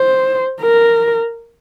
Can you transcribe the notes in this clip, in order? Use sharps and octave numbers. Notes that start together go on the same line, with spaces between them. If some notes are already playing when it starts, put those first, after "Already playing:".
Already playing: C5
A#4